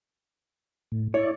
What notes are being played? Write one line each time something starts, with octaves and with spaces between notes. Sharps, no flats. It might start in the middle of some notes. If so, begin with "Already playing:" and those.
A2
E4 C#5 D5